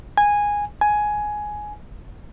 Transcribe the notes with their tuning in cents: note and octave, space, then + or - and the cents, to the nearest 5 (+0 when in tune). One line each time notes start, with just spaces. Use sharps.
G#5 -10
G#5 +10